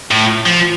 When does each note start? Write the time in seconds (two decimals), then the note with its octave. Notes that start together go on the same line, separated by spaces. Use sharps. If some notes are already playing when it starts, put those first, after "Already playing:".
0.11 A2
0.46 F3